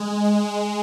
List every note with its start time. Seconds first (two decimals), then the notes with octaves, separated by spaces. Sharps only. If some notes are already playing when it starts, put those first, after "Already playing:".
Already playing: G#3
0.24 G#3